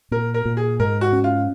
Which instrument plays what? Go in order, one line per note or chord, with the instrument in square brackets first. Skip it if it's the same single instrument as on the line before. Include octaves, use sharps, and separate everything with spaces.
[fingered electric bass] A#2 [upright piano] A#4
[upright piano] A#4
[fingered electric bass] A#2
[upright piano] G#4
[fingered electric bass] G#2 [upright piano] A#4
[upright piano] F#4
[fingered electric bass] C#4
[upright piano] F4